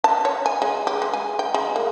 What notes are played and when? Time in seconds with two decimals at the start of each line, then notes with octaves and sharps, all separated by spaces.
0.04 A5
0.25 C#5
0.46 G#5
0.62 G#3
0.87 G4
1.02 G#3
1.13 G#5
1.39 G5
1.54 G#3
1.76 A#3